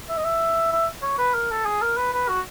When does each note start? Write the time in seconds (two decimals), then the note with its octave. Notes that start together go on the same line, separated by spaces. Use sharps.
0.09 E5
0.17 D#5
0.24 E5
0.72 E5
1.03 C#5
1.19 B4
1.34 A#4
1.51 A4
1.66 G#4
1.82 A#4
1.97 B4
2.13 B4
2.29 F#4